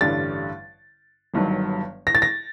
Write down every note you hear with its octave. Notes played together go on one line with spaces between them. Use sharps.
A1 G2 D3 G3 A6
G1 G2 D#3 F#3
A#6
A6
A#6